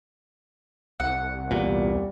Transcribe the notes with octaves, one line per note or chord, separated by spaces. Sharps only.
C2 F#5
E2 A#2 G3